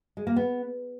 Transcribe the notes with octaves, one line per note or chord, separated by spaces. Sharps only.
G#3
A#3
B3